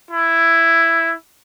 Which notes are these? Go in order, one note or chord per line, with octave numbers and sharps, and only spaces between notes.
E4